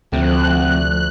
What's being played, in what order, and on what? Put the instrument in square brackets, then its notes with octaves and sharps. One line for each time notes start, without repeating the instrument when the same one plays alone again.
[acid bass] D2 [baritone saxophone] C3 [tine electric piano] F3 A3 [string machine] F#6